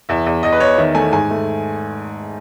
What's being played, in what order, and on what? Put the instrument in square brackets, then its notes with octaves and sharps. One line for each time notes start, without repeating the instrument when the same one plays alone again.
[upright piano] E2 E5
E2
E2 D#5
B4
E2 C#5
D#3 E5
A3 G#5
G#2 G#5
A3